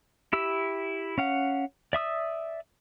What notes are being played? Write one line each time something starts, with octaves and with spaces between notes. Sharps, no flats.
E4 G4 E6
C#4 F5 F#5
D5 E5 D#6 E6